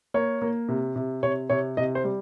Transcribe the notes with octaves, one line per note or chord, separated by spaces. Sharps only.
A#3 C#5
A#3
C3
C3
C3 C#5
C3 C#5
C3 D#5
C5
G3